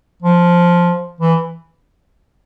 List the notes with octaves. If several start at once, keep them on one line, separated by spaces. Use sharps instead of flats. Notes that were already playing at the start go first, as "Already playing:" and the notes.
F3
E3